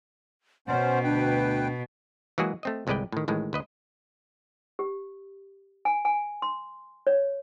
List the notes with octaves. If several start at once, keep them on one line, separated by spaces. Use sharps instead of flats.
B2 C#4 C5 F#5
D2 D4 B4 G5
E3 F#3 G#3 A#3 F#4 G#4
A3 C4 D#5
G1 C2 G#3 B4 D5 G5
A2 D#3
A1 A2 D#3 G#3
D2 B4 D#5
G4
G#5
G#5
C6
C#5